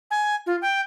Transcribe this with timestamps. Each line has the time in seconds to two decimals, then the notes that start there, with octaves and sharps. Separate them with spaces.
0.11 G#5
0.46 F4
0.62 G5